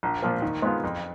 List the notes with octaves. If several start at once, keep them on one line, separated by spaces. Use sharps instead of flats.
A#1
A#2 F3 A#3 F4
D#3
G#3 B3 F4
F2